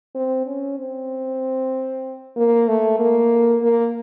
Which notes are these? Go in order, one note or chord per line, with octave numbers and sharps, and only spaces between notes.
C4
C#4
C4
A#3
A3
A#3
A#3